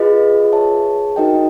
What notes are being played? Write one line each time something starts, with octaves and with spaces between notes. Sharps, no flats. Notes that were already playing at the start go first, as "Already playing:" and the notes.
Already playing: F4 G#4 B4 D#5
G#4 C#5 E5 A5
D#4 F#4 A#4 D#5 G5